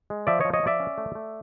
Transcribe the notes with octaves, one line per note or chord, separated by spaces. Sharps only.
G#3
F3 D5 E5
C#5 D#5
F3
C#5 D#5
F3 D5 E5
C#4
A3
A3